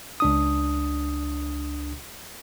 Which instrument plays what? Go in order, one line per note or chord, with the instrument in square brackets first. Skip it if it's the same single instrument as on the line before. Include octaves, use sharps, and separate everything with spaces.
[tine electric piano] C#2 D4 D#6